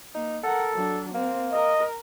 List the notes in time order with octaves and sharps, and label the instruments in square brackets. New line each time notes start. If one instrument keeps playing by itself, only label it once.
[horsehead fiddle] A#3 [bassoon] D#4
[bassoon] A4 [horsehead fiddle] A#4 F#5
[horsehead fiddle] F#3 D4
[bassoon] A#3 [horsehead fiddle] C4
[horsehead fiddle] A#4 [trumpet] D#5